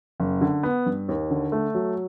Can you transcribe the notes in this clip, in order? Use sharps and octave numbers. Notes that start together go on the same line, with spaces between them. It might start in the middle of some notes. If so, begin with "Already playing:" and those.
F#1
D3
B3
G2
D#2
D3
A3
F#3